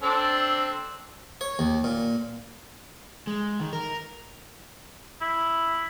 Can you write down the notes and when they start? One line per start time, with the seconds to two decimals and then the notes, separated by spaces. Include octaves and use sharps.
0.02 C4 D4 A4
1.41 C#5
1.59 D#2
1.84 A#2
3.27 G#3
3.60 D#3
3.73 A#4
5.21 E4